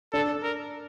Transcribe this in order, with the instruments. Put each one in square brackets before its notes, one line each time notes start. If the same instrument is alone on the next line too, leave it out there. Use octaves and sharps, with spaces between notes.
[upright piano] D4 [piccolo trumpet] A4
[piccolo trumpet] A#4